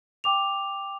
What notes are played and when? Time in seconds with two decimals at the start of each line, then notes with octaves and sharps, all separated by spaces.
0.24 G5 D6 F7